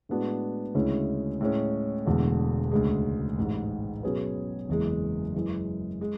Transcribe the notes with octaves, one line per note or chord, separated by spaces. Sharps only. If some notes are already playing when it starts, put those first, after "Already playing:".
A2 G#3 B3 D4 F#4
D2 C#3 G#3 C#4 E4
A2 G#3 C#4
E1 E2 D3 A3
D2 C#3 G#3
A1 G#2 G#3
B2 F#3 C#4 G#4 B4
F#1 E2 C#3 E3 G#3
F#2 E3 G#3
G#3